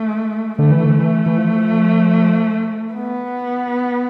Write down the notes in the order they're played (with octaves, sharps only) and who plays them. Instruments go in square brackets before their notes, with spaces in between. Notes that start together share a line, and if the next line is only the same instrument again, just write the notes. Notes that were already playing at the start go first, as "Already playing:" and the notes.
Already playing: [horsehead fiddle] A3
[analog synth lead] D3 [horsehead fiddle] A3
[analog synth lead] E3
D3
E3
E3
F3
[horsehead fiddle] B3